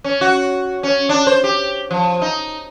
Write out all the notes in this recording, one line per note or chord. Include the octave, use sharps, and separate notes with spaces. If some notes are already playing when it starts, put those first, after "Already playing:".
C#4
F#4
C#4
D4
C5
G4
F3
D#4